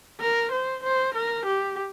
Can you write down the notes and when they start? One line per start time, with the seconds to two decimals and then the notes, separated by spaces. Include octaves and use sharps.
0.21 A#4
0.52 C5
0.84 C5
1.15 A#4
1.46 G4